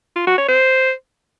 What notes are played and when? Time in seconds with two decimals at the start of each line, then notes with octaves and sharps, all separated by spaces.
0.16 F4
0.27 F#4
0.38 C#5
0.49 C5